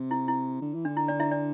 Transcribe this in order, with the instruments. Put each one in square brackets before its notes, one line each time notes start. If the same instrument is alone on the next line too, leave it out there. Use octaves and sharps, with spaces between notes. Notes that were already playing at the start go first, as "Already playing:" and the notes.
Already playing: [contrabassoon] C3
[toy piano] E4
E4
[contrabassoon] D3
E3
[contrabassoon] D3 [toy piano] D4
[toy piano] E4
D4 D5
E4 E5
D4 D5